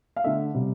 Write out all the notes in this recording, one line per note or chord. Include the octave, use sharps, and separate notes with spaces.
F5
D3 A3 E5
C3 G3